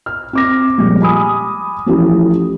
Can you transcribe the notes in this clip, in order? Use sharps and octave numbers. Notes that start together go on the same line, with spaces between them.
F6
C4 D6 A#6
A#2 F3 G3 G#3
G#5 B5 D#6
E3 F3 A3 C#4 E4 G4